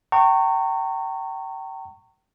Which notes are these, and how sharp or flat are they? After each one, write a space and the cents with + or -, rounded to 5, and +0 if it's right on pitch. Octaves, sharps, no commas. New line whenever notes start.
G5 -30 A#5 -35 C#6 -10